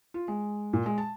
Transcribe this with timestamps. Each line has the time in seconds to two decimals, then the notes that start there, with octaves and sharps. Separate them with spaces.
0.14 F4
0.28 G#3
0.73 A#2
0.86 G#3
0.98 A5